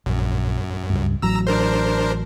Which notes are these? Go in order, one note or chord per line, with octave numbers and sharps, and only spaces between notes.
A#1 F#2
C#2 G2
A1 F#3 A#5 E6
D4 A#4 C5